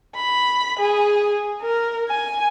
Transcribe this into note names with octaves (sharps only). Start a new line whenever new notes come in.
B5
G#4
A#4
G#5